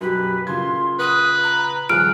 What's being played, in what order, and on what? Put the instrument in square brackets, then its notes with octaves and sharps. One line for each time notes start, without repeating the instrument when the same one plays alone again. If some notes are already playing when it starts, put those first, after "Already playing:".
[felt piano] F#2 B2 G4 [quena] B4
[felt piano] A#2 C#3 G#6 [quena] C6
[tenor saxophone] B4 [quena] D#6
[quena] A#5
[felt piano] D#1 F3 G#4 [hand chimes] F6 D7 [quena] F#6